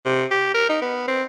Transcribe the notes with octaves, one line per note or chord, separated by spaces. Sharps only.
C3
G4
A#4
D#4
B3
C4